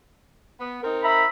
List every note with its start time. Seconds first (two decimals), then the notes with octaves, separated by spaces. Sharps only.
0.59 B3
0.83 C4 D#4 A#4
1.03 E5 A#5 B5